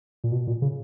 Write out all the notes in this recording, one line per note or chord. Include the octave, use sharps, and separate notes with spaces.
A#2
B2
A#2
C#3